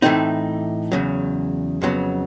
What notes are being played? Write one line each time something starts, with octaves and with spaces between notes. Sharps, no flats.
A2 E3 A3 C4 D#4
E2 C#3 F#3
F2 C#3 F#3 B3